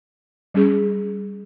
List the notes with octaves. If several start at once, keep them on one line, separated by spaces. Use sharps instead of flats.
G3 C#4 G#4